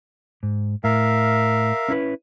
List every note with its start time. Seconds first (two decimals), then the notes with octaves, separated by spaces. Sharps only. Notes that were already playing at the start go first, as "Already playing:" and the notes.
0.43 G#2
0.84 A2 A#4 E5 F5
1.88 C#4 E4 B4